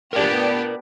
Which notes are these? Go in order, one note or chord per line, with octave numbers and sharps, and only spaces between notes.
B3 D4 G4 A#4 D5